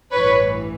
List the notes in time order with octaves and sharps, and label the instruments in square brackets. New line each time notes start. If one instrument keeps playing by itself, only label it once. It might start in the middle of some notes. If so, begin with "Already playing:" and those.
[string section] A1 G2 E3 B4 C#5